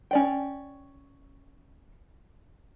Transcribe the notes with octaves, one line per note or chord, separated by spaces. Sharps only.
C#4 D5 G5